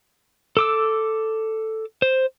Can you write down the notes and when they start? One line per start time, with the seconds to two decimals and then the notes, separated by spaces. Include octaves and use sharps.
0.57 A4 D6 E6
2.02 C5